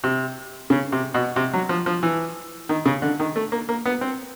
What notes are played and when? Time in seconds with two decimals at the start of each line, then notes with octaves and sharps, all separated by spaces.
0.04 C3
0.70 C#3
0.92 C3
1.14 B2
1.36 C3
1.53 F#3
1.69 F3
1.86 F3
2.03 E3
2.69 D#3
2.86 C#3
3.02 D3
3.20 D#3
3.36 A3
3.52 A#3
3.69 A#3
3.86 B3
4.01 C4